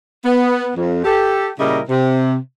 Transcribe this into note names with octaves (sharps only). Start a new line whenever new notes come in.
B3
F2
G4 A4
A#2 C#3 G3 E4 A#4 D#5
C3